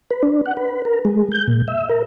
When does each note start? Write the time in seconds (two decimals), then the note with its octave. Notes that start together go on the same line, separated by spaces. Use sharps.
0.11 B4
0.23 D4
0.46 F#5
0.57 B4
0.85 A#4
1.05 G#3
1.32 G6
1.48 A#2
1.68 E5
1.89 A#4